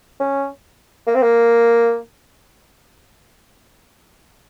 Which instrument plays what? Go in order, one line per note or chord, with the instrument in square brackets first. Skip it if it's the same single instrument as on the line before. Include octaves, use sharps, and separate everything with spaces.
[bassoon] C#4
A#3
C4
A#3